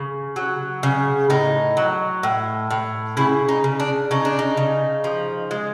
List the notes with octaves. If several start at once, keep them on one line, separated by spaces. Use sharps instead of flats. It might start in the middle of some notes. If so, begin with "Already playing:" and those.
Already playing: C#3
F#3
C#3
A2 D#4
F#3
A2
A2
C#3 E4
D#4
C#3
D4
C#3 D#4
D4
D#4
C#3
F3
G#3